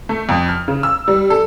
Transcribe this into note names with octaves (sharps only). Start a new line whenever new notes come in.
A3
F2
F6
C#3
E6
G3
A4